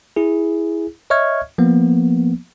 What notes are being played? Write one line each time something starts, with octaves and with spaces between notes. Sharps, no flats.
E4 G#4
C#5 D#5 E5 C#6 F6 G#6
F3 A#3 B3